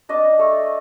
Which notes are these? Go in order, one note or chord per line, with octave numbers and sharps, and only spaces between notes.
D4 D#5
A3